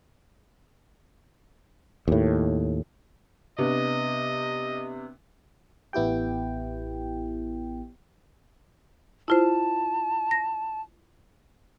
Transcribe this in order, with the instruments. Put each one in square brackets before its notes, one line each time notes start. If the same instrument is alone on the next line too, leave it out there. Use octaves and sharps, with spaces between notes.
[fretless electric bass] D#2 A2
[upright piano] C3 B3 D4 [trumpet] D#5
[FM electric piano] A1 B3 E4 G4 G5
[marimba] E4 F4 C5 [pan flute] A5
[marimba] A#6